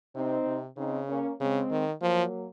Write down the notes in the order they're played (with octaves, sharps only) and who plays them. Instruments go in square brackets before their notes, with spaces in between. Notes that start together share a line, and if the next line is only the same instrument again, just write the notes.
[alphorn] C3 [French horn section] C4 D#4
[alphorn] C3
[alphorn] C#3 [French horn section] C4 D#4
[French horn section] A#3 C#4
[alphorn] C#3 [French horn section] G#3 C4
[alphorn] D#3
[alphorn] F3 [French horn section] F#3 A#3